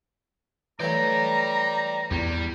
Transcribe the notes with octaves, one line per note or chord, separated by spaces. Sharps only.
E3 F#3 A3 D5 G5 A#5
E2 G3